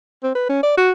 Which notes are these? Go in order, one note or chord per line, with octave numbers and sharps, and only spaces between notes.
C4
B4
C#4
D5
F#4